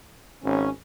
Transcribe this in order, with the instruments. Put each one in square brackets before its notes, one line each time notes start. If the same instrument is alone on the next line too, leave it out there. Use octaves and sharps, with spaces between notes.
[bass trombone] G#1 [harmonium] C#4